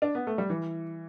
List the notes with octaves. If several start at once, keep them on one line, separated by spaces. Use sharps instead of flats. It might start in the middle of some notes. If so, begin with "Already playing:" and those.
D4
B3
A3
G3
E3